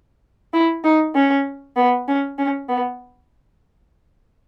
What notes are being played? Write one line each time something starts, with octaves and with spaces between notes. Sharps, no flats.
E4
D#4
C#4
B3
C#4
C#4
B3